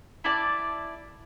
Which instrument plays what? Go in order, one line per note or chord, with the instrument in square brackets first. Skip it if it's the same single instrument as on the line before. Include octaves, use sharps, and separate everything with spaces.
[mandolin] E4 D5 A5